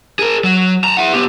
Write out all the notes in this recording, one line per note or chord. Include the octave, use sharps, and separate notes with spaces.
G#4 A#4
F#3
A5 A#5
E4 F#5
B3 G4